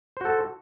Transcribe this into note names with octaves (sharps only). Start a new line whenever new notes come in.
F#4 A4 C5